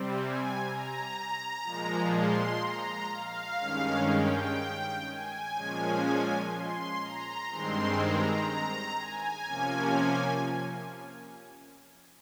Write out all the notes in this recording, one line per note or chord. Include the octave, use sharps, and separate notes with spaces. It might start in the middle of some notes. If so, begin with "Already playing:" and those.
Already playing: C3 G3 C4
G#5
A#5
A#2 F3 G#3
C6
A#5
F5
G2 D#3 G#3 C#4
G5
G#5
A#2 F3 G#3 C#4
C6
A#5
G2 D#3 G#3 C4 C6
A#5
A#5
G#5
C3 F3 A#3 C#4